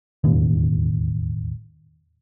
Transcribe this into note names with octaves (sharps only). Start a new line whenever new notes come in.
E1 A1 D#2